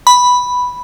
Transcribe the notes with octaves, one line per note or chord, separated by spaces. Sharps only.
B5